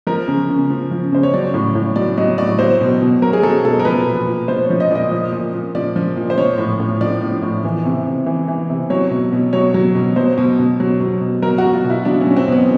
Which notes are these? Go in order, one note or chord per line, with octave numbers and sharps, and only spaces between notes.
F3 A#4
C#3
C#3
F3
F3
C#3 C5
C#5
F#3 D5
A2
A2
F#3 D5
F#3 D#5
A2 D5
F#3 C5
B2
B2
F#3 A#4
G#4
F#3 A4
B2 A4
A#4
F3 B4
A#2
A#2
F3 C5
C#5
F3
D#5
A#2 D5 D#5
F3
A#2
A#2
F3 D5
F3
A#2
C5
F3 C#5
A2
A2
F3 D5
F3
A2
E3
C3
C3
E3
E3
C3
F#3 C#5
B2
B2
F#3 C#5
F#3
B2
F#3 C5
B2
B2
F#3
F#3
B2
F#3 A#4
F#4
B2
F4
B2
E4
F#3 D4
C#4
F#3
C4
B2 B3